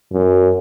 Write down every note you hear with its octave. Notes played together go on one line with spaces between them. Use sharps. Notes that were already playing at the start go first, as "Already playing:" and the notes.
F#2